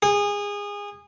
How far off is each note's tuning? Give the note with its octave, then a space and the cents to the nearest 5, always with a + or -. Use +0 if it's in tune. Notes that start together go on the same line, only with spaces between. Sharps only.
G#4 -25